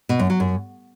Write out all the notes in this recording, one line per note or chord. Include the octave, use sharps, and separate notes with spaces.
B2
F#2
F#3
F#2